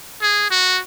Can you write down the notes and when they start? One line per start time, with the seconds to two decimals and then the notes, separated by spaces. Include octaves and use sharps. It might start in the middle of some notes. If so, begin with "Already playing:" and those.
0.22 G#4
0.50 F#4